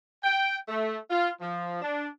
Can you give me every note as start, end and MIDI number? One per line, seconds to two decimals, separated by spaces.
0.24 0.55 79
0.68 0.97 57
1.10 1.29 65
1.41 1.78 53
1.82 2.07 62